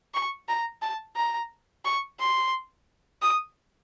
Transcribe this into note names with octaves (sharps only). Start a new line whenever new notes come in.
C#6
A#5
A5
A#5
C#6
C6
D#6